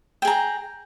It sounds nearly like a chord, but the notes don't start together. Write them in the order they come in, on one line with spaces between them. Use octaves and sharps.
G5 G#4 A#5